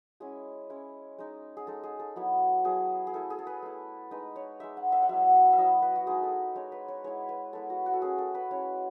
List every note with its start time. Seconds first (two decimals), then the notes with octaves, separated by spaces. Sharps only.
0.20 G#3 C#4 E4 G#4
0.70 G#3 C#4 E4
1.19 G#3 D#4
1.57 G#4
1.67 G#3 D#4 A4
1.83 G#4
2.00 A4
2.16 F#3 B3 E4
2.64 F#3 B3 E4 G#4
3.07 G#4
3.13 A3 E4 A4
3.30 G#4
3.39 A4
3.47 B4
3.63 A3 E4
4.11 G#3 D#4 B4
4.36 C#5
4.60 G#3 D#4 E5
4.77 F#5
4.92 E5
5.03 F#5
5.09 F#3 B3 E4 E5
5.23 F#5
5.33 E5
5.53 E5
5.58 F#3 B3 E4 D#5
5.82 B4
5.96 F#4
6.07 G#3 D#4 G#4
6.23 A4
6.56 G#3 D#4 C#5
6.72 B4
6.88 C#5
7.04 G#3 B3 E4 C#5
7.29 B4
7.53 G#3 B3 E4 A4
7.70 F#4
7.86 F#4
7.94 A4
8.02 G#3 C#4 E4 G#4
8.18 A4
8.35 B4
8.51 G#3 C#4 E4 C#5